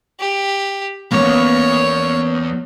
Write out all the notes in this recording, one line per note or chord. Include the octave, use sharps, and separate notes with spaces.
G4
E2 G2 A#3 B3 C#4 C#5